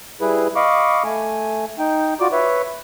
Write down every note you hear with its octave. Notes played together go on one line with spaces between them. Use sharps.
G3 E4 G#4 B4
D#5 F5 B5 C#6 D6
A3 G#5
D#4 G5
F4 F#4 D5 D6
B4 C#5 E5